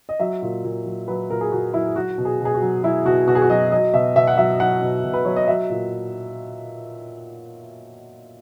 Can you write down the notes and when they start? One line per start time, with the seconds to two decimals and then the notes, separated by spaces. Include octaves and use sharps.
0.09 D#5
0.20 F#3 E5
0.42 A#2
0.64 A#2
0.86 F#3
1.08 F#3 B4
1.30 A#2 A#4
1.41 G#4
1.52 A#2 F#4
1.74 F#3 E4
1.96 F#3 F#4
2.18 B2
2.25 G#4
2.40 B2
2.45 G#4
2.54 F#4
2.62 F#3
2.83 F#3 E4
3.05 B2 F#4
3.27 B2 F#4
3.35 G#4
3.42 F#4
3.50 F#3 D#5
3.72 F#3 D#5
3.93 B2 E5
4.16 B2 E5
4.27 F#5
4.38 F#3 E5
4.60 F#3 F#5
4.82 B2
5.04 B2
5.14 B4
5.25 F#3 C#5
5.36 D#5
5.47 F#3 E5
5.70 A#2